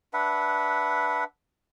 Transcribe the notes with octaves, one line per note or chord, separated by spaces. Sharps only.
D4 B4 E5 F#5